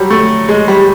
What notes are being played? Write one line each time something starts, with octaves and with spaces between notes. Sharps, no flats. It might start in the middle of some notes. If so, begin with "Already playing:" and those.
Already playing: F#3 G3
A3
G#3
G3